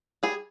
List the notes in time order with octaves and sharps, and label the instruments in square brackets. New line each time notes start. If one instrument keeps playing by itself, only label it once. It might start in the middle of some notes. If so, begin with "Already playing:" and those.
[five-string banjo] G3 G#4